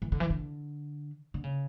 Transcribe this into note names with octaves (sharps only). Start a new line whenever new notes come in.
E3
D3
E3
D3
D3
C#3